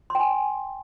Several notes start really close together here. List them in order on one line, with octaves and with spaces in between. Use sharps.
C6 G5 G#5